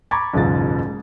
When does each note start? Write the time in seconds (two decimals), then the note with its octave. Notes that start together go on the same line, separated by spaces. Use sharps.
0.11 A#5 B5 C#6 D6 G#6 A6
0.33 F#1 B1 E2 G#2 F4 A6
0.86 G#3